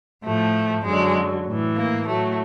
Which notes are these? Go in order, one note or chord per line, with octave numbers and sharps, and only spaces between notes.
A2 F3 A3
F#2 D3 F#3 G#3
A2 E3
A#3
A2 F#3 A3